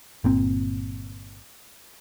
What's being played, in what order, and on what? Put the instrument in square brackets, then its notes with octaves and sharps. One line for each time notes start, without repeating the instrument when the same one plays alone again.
[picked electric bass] G1 A#2 C4